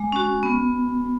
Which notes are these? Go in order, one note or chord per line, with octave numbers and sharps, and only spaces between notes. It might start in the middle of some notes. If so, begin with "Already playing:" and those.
Already playing: G#3
C#4 F#4
B3